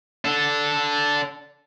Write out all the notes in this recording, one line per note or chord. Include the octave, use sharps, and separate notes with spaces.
D4 A4